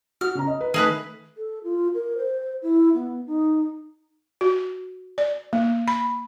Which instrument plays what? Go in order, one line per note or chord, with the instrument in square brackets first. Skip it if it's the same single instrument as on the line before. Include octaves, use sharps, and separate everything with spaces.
[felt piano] F#4 [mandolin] F6
[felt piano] C#3 C#4 A#5
D#5
B4
[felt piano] D#3 A3 [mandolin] G#4 A#4 B4
[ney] A4
F4
A#4
C5
E4
B3
D#4
[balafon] F#4
D5
A#3
B5